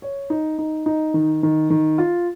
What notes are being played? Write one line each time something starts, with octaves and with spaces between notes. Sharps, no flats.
C#5
D#4
D#4
D#4
D#3
D#3
D#3
F4